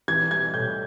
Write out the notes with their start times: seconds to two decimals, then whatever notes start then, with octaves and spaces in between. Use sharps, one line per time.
0.08 E3 G#6
0.31 G3 G#6
0.54 A2 G6